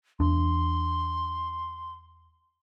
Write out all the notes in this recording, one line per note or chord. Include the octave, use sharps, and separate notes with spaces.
E2 D4 C6